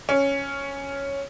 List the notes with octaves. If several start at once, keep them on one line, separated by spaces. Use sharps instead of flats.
C#4